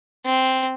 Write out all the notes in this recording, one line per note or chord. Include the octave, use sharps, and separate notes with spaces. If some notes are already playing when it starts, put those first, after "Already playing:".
C4